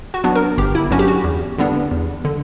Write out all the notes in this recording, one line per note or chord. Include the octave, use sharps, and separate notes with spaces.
F#4
F#3 B3 D4
A#4
G1 G4
E4
G2 F#3 C#4 F#4
G4
F#4
E2
D3 G3 B3 D4
E2
D3